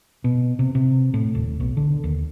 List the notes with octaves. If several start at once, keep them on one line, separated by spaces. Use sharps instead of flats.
B2
C3
C3
A2
D#1
B1
D3
D#2